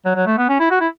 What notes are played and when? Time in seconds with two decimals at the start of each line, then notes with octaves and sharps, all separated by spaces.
0.05 F#3
0.16 F#3
0.26 A3
0.38 B3
0.49 C#4
0.60 E4
0.71 F#4
0.81 E4